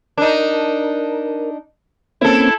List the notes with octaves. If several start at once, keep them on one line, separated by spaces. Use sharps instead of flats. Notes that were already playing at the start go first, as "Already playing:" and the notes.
D4 D#4 A#4
A#3 C4 C#4 E4 A4